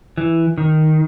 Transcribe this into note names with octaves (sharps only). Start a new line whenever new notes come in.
E3
D#3